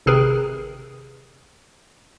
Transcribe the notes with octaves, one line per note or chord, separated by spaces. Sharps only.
G#1 C3 G#4 A#4 B4